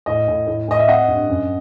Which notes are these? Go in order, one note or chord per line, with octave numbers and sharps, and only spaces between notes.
A2 D#5
A2
A2
A2 D#5
E5
C4 D#5 F#5
G2
F#2